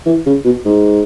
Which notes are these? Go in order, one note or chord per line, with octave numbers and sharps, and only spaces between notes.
E3
C#3
B2
G#2